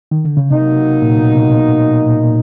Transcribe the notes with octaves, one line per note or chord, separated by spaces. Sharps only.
D#3
D3
C#3
C3 F#3 A#3 D#4
A#2
B2
B2
C3
B2
A#2
B2
A#2
A#2